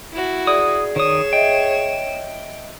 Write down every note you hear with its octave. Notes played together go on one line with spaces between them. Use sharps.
E4 F#4
G#4 D5 D#6
D#3 C#5 D#6 E7
D#5 E5 G5